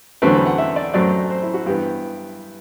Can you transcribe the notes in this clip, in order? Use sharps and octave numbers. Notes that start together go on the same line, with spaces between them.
E2 D3 F#3 A3 C4 B4
B4
F#5
E5
D5
F#2 F#3 A3 C4 D5
C5
E4
F#4
G2 E3 B3 G4